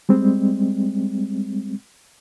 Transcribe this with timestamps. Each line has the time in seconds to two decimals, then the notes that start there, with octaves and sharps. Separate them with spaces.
0.09 G3 G#3 C4